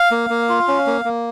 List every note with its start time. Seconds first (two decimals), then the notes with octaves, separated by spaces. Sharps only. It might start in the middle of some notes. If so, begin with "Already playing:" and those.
Already playing: F5
0.11 A#3
0.30 A#3
0.49 F4
0.68 C#4
0.87 A#3
1.05 A#3